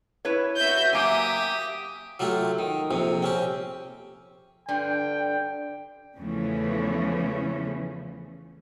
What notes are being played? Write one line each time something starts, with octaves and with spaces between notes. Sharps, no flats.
E4 B4 C#5
F#4 E5 G6
F#3 A#3 G4 E5 G#5 D#6
F#3 A3 F4 G4
D#3
A#1 F2 C3
C4 C#4 G4
G2 D3 F4 G5
E2 C#3 E3 F3 A3 C#4